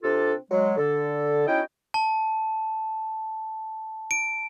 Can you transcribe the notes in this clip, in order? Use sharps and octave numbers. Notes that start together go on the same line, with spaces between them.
C3 C4 D4 F4 G4 A4
F#3 G#3
D3 A4
C#4 D#4 E4 F#4 D#5 G5
A5
D7